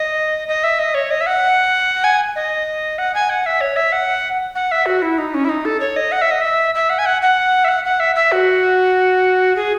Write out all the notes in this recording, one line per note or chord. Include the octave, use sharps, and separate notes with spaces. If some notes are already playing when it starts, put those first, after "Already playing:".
Already playing: D#5
D#5
E5
D#5
C#5
D#5
E5
F#5
G#5
D#5
F#5
G#5
F#5
E5
C#5
E5
F#5
F#5
E5
F#4
E4
D#4
C#4
E4
D#4
A4
C#5
D#5
F#5
E5
D#5
E5
E5
F#5
G#5
F#5
F#5
E5
F#5
F#5
E5
E5
F#4
G#4